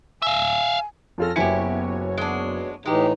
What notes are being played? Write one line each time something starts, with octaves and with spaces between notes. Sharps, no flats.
E5 F5 G#5
F2 C#4 F4 A4 F6 A#6
F#1 B3 E4 F#4 G4 C#5 G#5 C#7
G#3 D4
A2 E3 G#3 D#4 G4